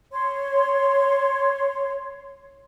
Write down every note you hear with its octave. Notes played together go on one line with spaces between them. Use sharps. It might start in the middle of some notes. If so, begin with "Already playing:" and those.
C#5 C6